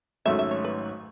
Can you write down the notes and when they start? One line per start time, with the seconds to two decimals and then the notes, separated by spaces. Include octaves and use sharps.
0.26 G#1 G#2 F#3 A3 C#4 E5
0.39 E5
0.51 C#5
0.65 B4